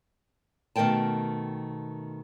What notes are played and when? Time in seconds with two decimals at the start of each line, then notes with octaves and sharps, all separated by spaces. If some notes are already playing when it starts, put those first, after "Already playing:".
0.76 B2 D#3 A3 A#4 G5 A5